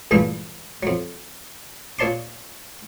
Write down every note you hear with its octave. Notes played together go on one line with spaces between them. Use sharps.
C#2 G2 A#2 E3 A3
F2 F#3
A#2 C#5 D5 A5 C6 D6